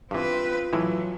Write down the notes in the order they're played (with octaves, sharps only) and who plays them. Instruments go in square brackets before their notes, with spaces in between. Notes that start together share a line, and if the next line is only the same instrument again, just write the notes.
[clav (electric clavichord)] G2 E3 [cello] C4 B4 [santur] F4 D#6
[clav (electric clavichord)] A2 G#3 E4 [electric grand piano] E3 [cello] F#3